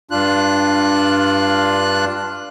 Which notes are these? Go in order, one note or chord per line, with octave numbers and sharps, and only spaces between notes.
G2 D4 F4 F#6